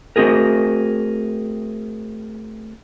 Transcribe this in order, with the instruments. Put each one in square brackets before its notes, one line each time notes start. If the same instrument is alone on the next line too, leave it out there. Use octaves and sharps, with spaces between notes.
[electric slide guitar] A3 C4 F#4 G#4 A#4